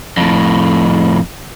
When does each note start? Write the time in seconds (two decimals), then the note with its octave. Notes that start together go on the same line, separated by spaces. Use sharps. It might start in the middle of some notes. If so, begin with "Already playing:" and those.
0.17 F2 A2